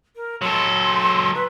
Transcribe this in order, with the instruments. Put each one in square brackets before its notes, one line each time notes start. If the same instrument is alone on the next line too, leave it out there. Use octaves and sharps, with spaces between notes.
[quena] A#4
[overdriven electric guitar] F#3 A4 [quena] C6
[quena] B4